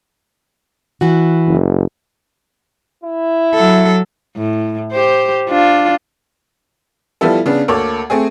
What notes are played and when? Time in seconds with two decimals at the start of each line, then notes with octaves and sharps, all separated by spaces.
1.01 E3 F#4
1.47 F#1
3.03 E4
3.54 F#3 A4
4.37 A2
4.92 G4 C5
5.49 D4 F4
7.21 F3 G3 B3 E4 A4
7.46 C#3 B3 D4
7.68 D2 A#3 A4 C#5 D6
8.10 A3 C4 G#4